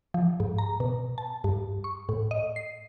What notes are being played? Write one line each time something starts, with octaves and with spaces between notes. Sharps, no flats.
F3
G#2
A#5
B2
A5
G2
C#6
A2
D#5
C7